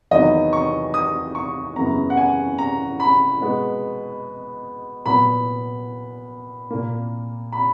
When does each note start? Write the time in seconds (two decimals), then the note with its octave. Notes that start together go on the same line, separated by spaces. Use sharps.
0.11 E2 D#3 F#3 B3 D#5
0.53 C#6
0.94 D#6
1.35 C#6
1.76 F#2 C#3 E3 B3 A#5
2.10 F#5
2.17 G#5
2.58 A#5
3.00 B5
3.41 B2 G#3 B3
5.06 A#2 F#3 B3 B5
6.70 A#2 A#3
7.52 B5